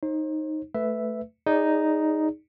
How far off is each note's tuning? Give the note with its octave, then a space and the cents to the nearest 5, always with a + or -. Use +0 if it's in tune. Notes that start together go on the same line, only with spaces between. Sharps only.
D#4 +0 C5 +40
A3 +0 B4 +10 E5 +0
D#4 +0 G#4 -15 D5 -15